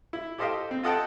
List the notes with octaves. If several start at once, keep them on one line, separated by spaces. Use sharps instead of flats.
E4
G4 A4 C5 D#5 F5 G5
C4
F4 A4 D#5 F#5 G5 A5